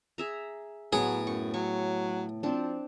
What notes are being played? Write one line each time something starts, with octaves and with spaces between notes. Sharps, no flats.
G#4 E5 A#5
A2 F#3 B3 G#4
F#2 C#6
F#3 C#6
F3 C4 D4